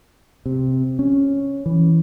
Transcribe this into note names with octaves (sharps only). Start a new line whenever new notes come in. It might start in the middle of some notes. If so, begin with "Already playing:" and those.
C3
C#4
E3